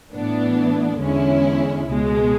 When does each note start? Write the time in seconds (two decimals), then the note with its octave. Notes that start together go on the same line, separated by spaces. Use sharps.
0.12 A2 E3 B3 D4
0.99 E2 D3 G#3 C#4 E4
1.87 C#2 B2 G#3